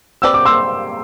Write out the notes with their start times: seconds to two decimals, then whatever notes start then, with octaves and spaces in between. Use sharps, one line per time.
0.22 C4 G4 B4 D5 E6
0.34 D6
0.45 C6 E6